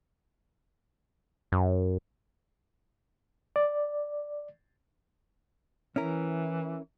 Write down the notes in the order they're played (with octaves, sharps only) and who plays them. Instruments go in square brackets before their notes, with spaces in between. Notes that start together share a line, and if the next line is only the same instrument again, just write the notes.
[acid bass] F#2
[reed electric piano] D5
[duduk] E3 [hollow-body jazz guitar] C#4 E4 A#4